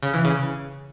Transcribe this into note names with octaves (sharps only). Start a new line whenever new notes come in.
C#3
E3
C#3